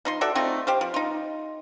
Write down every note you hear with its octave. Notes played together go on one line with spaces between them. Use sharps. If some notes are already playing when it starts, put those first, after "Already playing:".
F3 D#4 C6
F#4 A4 D5 E5
A3 C4 D#4 F4
G4 C5 F5
F3
D#4 F4